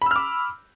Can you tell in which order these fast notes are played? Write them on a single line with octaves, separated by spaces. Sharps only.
B5 E6 F6 D6